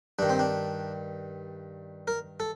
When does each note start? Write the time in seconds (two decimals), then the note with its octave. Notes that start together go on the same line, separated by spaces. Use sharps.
0.19 G2 D#3 D4
0.29 C4
0.39 D4
2.08 A#4
2.40 A4